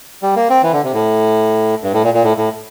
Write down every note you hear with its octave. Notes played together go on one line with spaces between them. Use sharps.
G3
A#3
C4
E3
D3
C3
A2
G2
A2
A#2
A#2
A2
A2